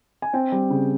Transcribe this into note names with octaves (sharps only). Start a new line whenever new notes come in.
G#5
C4 G5
G3
C#3